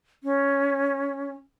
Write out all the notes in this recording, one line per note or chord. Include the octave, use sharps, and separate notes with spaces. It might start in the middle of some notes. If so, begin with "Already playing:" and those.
C#4